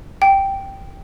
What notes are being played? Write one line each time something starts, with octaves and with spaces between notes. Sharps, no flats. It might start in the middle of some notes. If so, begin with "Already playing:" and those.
G5